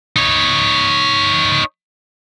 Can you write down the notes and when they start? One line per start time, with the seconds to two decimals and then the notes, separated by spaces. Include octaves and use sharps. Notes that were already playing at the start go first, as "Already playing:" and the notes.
0.16 D#4 C#5